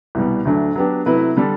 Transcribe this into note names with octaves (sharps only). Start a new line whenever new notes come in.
C2 B2 G3
D2 D3 F#3 A3 D4
F#3 B3 D4 G4
C3 F#3 A3 E4 B4
D3 G3 D4 A4